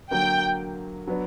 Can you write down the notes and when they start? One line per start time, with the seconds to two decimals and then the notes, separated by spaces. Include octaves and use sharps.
0.11 D3 F#3 A#3 G5
1.07 F#3 B3 D4